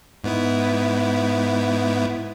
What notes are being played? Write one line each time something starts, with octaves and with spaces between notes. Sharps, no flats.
G#2 B3 E4